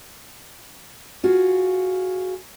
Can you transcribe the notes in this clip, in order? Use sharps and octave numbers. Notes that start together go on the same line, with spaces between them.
F4 F#4 G#4